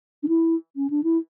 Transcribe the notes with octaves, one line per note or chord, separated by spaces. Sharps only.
D4
E4
C#4
D4
E4